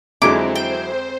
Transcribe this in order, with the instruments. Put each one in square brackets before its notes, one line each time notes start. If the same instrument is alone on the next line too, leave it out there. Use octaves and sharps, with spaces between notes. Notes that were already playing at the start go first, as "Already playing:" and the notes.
[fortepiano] F2 D3 G#3 [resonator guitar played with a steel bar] E3 F#3 E4 [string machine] C4 [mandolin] D6
[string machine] C5 [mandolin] G5